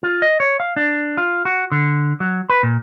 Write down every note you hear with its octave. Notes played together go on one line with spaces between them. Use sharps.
F4
D#5
C#5
F5
D4
F4
F#4
D3
F#3
B4
A#2